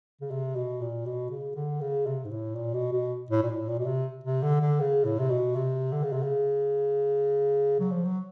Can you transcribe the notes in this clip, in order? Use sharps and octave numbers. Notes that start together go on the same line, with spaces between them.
C#3
C3
B2
A#2
B2
C#3
D3
C#3
C3
G#2
A2
A#2
B2
B2
A2
A#2
A2
A#2
B2
C3
C3
D3
D3
C#3
A2
C3
B2
C3
D3
C#3
C3
C#3
F#3
F3
F#3